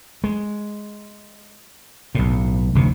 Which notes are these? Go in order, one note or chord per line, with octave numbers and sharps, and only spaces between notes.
G#3
B1 A2
F1 D2 A2 C3